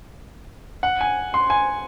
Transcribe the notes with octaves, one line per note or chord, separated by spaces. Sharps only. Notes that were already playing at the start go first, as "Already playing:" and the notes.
F#5
G#5
C6
G#5